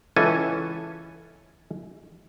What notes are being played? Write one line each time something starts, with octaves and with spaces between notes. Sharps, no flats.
C#2 E3 C#4 A4 G#5